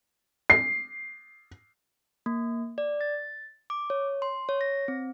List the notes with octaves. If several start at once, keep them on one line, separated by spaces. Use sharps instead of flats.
C7
A#3
D5
A6
D6
C#5
C6
C#5
A#6
C4